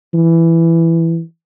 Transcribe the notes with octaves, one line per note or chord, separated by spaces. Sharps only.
E3